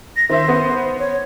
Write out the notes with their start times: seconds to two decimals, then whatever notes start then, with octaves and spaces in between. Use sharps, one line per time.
0.17 A#6
0.29 D#3 C5 E5
0.48 B3
0.99 C#5